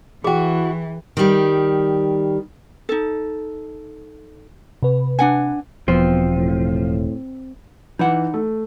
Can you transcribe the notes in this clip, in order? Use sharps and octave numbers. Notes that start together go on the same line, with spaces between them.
E3 E4 F#4 G#4 G5
D#3 G3
D#4 A4
C3 B4
D4 F#5 G#5
E1 F3 B3 C4
A2
E3 D#4 F#5
A3